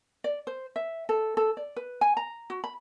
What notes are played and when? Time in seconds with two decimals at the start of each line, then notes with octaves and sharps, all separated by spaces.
0.24 D5
0.47 C5
0.76 E5
1.09 A4
1.37 A4
1.57 D5
1.76 B4
2.01 G#5
2.17 A#5
2.50 F#4
2.64 B5